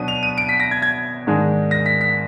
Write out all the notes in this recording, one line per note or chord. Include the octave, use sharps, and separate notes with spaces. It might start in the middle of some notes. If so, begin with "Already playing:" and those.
Already playing: B2 F#3 B3 D4 D#7
F7
D#7
D7
B6
A#6
G#6
G#6
G#2 D#3 G#3 D4
A#6
B6
B6